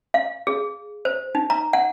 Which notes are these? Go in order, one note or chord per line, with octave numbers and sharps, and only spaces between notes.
F5
G#4
C5
D#4
A#5
F#5